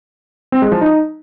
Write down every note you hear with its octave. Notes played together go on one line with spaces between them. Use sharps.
C4
G#3
F3
D#4